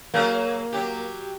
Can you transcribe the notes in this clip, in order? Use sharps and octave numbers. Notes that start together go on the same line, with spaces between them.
F#3 A#3 G#4 A#4
F#3 G4